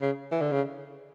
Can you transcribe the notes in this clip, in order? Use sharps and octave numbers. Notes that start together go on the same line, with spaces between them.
C#3
E3
D3
C#3